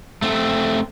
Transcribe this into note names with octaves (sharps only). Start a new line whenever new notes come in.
A3 C4